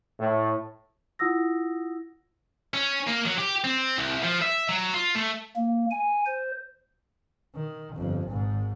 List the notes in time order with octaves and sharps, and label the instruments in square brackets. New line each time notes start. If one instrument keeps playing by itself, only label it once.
[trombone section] A2
[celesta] E4 F4 F#5 D#6 E6 A#6
[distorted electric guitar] C#4
A#3
F#3
G4
C4
C2
F3
E5
F#3
F4
A3
[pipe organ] A#3
G#5
C5
[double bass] D#3
G1 F2
G#1 G#2